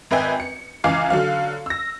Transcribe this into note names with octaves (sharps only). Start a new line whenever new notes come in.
G#1 B4 D#5 E5 G5 G#5
C#7
C#2 E3 F5 G#5 D6 C7
D3 F#3 F5
E6 A#6